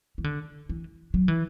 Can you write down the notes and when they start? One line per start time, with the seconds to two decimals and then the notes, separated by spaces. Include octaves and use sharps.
0.18 E3
0.24 D3
0.69 E3
1.14 F#3
1.28 E3